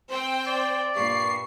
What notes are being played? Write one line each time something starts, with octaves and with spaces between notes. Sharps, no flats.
C4 C5 G5
D5
G2 A#2 C#6 C7